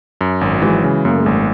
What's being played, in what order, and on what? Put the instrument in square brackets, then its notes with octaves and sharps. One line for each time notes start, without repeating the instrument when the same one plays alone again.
[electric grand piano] F#2
G#1
[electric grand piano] E3 [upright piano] F#3 G#3
[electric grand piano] C#3
[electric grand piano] F#2 [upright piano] A#3
[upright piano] A3
G#3 A#3
[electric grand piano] G#1